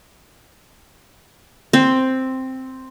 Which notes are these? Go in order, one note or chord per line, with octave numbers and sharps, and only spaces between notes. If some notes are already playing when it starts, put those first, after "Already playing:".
C4